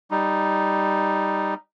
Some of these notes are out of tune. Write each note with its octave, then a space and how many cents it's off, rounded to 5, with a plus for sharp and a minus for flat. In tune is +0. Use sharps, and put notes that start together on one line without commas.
G3 +0 D#4 -5